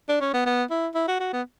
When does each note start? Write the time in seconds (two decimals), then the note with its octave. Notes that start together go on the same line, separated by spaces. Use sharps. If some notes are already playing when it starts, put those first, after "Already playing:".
0.09 D4
0.21 C#4
0.33 B3
0.46 B3
0.70 E4
0.95 E4
1.08 F#4
1.20 F#4
1.33 B3